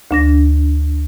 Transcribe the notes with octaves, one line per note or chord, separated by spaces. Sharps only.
D2 D4 A#6